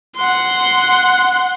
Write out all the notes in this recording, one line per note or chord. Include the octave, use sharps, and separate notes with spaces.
F#5 C6